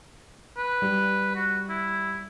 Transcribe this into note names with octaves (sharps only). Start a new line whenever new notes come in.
B4
G3
F#4
E4